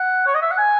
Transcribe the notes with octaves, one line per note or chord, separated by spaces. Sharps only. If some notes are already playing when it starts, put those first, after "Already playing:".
Already playing: F#5
C#5
D#5
E5
F#5
G#5